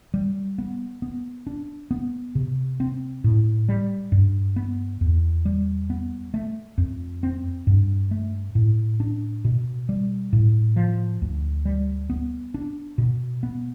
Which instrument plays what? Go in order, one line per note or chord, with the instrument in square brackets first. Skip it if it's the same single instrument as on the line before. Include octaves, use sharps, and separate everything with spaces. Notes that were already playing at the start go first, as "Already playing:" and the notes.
[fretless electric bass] G3
B3
B3
D4
B3
C3
C4
A2
G3
G2
B3
E2
G3
B3
A3
F2
C4
G2
A3
A2
D4
B2
G3
A2
F3
D2
G3
B3
D4
B2
B3